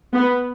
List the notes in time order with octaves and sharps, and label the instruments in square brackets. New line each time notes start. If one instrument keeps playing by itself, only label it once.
[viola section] B3